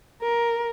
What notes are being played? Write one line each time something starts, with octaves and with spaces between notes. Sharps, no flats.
A#4